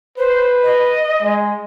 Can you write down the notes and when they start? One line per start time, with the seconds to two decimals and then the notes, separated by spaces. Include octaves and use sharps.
0.18 B4 C5
0.64 D#5
1.22 G#3